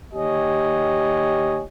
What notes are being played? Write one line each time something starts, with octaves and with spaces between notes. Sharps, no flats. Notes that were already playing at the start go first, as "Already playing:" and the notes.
D#2 G4 C#5 D#5 G#5